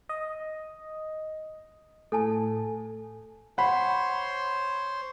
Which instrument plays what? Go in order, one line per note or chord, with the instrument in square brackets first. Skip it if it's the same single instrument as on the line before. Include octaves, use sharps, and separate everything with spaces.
[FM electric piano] D#5
[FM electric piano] A2 [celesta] A4 G#5 A5
[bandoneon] C5 C#5 C6 [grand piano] F#5 B5